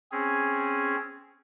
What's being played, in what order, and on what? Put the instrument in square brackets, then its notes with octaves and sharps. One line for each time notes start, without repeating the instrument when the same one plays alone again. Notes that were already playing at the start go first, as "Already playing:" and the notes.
[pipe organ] C4 C#4 G#4